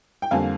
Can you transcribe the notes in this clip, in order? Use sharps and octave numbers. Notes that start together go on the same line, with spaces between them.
G5
F2 D3 G3 A#3 F5 G#5